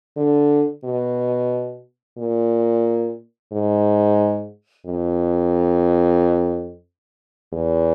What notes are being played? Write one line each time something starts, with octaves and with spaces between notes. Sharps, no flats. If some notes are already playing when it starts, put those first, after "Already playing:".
D3
B2
A#2
G#2
F2
E2